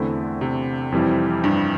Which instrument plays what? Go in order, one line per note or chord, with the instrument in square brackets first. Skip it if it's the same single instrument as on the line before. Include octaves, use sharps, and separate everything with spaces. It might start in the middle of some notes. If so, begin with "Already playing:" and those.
Already playing: [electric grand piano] E2 D3 A3 C4 E4
[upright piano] C3
[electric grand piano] F2 E3 G3 C4 E4
[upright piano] G2